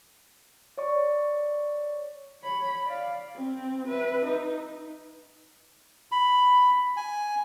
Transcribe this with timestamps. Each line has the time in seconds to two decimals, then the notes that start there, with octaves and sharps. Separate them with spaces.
0.78 C#5 D5 C#6
2.42 C#5 B5
2.85 D5 F5
3.35 C4
3.88 B4 E5
4.26 D#4
6.12 B5
6.97 G#5